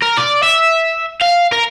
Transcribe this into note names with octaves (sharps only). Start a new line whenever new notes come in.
A#4
D5
E5
F5
A#4